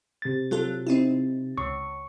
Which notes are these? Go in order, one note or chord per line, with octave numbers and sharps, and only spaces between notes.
C3 A6
F#3 F4 A4
C4 D#4 E4
C#2 C#6